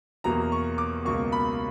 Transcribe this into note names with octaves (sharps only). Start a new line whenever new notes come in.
E2 B2 F#3 A#3 A#5
C#6
D6
C#2 B2 A#3 C#6
B5